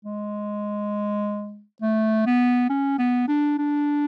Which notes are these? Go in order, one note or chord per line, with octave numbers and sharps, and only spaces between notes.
G#3
A3
B3
C#4
B3
D4
D4